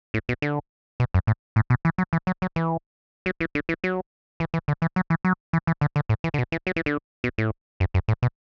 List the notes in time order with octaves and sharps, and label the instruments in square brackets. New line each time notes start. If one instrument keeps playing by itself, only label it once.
[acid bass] A2
B2
D3
B2
F#2
A2
A2
B2
E3
F#3
E3
F#3
F#3
E3
F#3
E3
D3
E3
F#3
E3
E3
D3
E3
F#3
E3
F#3
E3
E3
D3
D3
A2
E3
D3
B2
E3
F#3
E3
D3
B2
A2
F#2
F#2
A2
B2